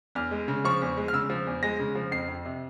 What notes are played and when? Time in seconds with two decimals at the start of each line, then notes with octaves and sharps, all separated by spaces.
0.15 E2 F6
0.31 G#3
0.48 C#3
0.64 F3 C#6
0.82 E2
0.97 G#3
1.08 F6
1.13 C#3 E6
1.30 F3
1.47 E2
1.63 G#3 A#6
1.80 C#3
1.95 F3
2.11 F2 C7
2.28 F2
2.45 C3